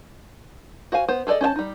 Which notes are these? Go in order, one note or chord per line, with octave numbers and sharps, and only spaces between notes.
F#4 C5 F5 G#5
B3 C5
G#4 A4 B4 D5 D#5
C#4 C5 D#5 A5
G3 D#4